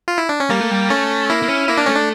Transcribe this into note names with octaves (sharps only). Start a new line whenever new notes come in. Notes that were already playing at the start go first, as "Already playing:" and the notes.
F4
E4
D4
C#4
G3 A#3
A3
G3
A3 C#4
A#3 E4
A#3
C#4
A#3 E4
D4
A3 C#4
D4